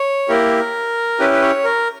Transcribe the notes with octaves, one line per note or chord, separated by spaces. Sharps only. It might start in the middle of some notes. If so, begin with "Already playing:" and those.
Already playing: C#5
A#3 E4 G4 A#4
C#4 E4 G4 B4
B4
C#5
A#4